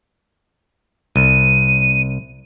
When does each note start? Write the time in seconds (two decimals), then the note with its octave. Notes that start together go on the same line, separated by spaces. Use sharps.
1.16 C2 D#7